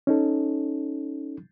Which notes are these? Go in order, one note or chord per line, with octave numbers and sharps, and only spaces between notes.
C#4 D#4 A4